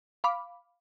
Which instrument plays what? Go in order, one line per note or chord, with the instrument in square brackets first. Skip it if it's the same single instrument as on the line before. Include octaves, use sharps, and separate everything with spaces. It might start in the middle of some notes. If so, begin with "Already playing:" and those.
[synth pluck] F5 B5 D6